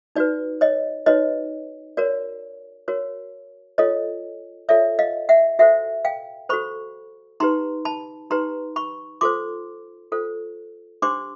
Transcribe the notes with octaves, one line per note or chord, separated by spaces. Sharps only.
D#4 F#4 B4 D5
C#5 D#5
D#4 F#4 B4 C#5 D#5
F#4 A#4 C#5 D5
F#4 A#4 C#5
F4 A4 C#5 D#5
F4 A4 C#5 D5 E5
D#5 F5
E5 F#5
F#4 A4 C5 E5 F#5
F5 G5
F#4 A4 C5 B5 C#6
D#4 G4 B4 A#5 C6
A5 B5
D#4 G4 B4 A#5 C6
B5 C#6
F4 A4 C5 C6 D6
F4 A4 C5
D4 G4 C5 C6 D6